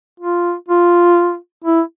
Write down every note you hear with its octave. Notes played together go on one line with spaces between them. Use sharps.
F4
F4
E4